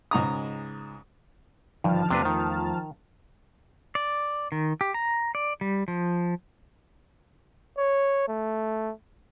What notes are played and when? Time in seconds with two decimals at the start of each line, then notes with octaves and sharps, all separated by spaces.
0.11 C#2 G#2 A#5 D#6
1.84 G#1 G2 D3 D#3 F3 A5 F6
2.10 E2 C3 A3 D4 B4
2.25 D#3
3.95 D5
4.52 D#3
4.81 G4
4.94 A#5
5.35 D5
5.61 G3
5.88 F3
7.78 C#5
8.28 A3